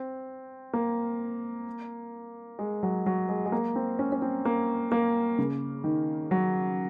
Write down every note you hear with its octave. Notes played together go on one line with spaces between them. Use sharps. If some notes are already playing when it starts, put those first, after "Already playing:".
Already playing: C4
A#3
G#3
F#3
F#3
G#3
G#3
A#3
C4
C#4
C#4
C4
A#3
A#3
C#3
D#3
F#3